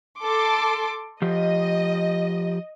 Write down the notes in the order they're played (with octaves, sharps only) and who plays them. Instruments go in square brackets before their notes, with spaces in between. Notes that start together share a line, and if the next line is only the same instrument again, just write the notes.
[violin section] A4 C6 D6
[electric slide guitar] F3 G4 [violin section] D#5